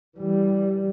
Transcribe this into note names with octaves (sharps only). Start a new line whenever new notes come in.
E3 G3